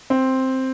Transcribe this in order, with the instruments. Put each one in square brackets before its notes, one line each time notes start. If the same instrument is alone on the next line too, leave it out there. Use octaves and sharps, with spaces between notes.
[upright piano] C4